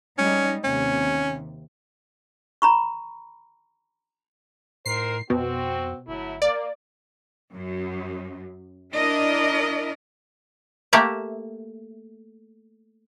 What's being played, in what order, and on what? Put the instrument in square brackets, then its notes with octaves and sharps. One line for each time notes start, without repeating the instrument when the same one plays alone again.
[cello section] G3 G#3 D#4 [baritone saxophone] C#4
[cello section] D#2 C3 [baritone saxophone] C#4
[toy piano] A#5 B5 C#6
[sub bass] A2 [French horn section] D#3 A#4 C5 [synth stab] C7
[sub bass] F2 [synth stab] B2 [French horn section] C4 F#4
[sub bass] G1 [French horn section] F#3 A3 E4
[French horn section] A#3 [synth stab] D5
[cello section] F#2
D4 E4 A#4 D5 D#5
[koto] A3 A#3 G4 E5